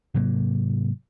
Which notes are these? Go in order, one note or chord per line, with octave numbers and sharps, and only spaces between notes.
G#2 C3 F#3 A#3